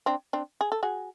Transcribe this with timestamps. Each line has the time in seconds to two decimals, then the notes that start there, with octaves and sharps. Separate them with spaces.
0.06 C4 D4
0.33 C4 D4
0.61 G#4
0.72 A4
0.83 F#4 G#4